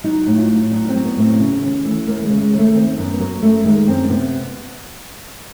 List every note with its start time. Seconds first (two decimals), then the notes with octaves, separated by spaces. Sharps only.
0.04 F#3 D#4
0.27 A2
0.38 F4
0.50 A2
0.72 F#3 D4
0.89 C4
0.95 F#3
1.05 B3
1.17 A2
1.23 C4
1.40 C#3 C#4
1.62 D#2 C#4
1.85 E3 A3
2.07 D#2 A#3
2.25 C#3 G#3
2.41 G#3
2.53 D#2
2.58 A3
2.75 D#3 C4
2.98 F#2 B3
3.14 B3
3.20 F#3 A#3
3.42 F#2 A3
3.65 D#3 G#3
3.88 F#2 C4
4.10 C3 B3